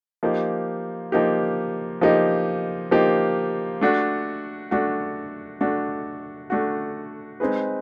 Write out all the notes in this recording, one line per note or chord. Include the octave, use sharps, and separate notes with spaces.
F3 A#3 D#4 G4
F3 A#3 D#4 G4
F3 A#3 D#4 G4
F3 A#3 D#4 G4
A3 D4 F#4
A3 D4 F#4
A3 D4 F#4
A3 D4 F#4
G#3 C4 D#4 G#4 B4